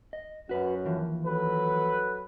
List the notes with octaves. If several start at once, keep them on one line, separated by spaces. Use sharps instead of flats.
D#5
F#2 F#4 B4
D#2 E3 F3
F#3 A4 B4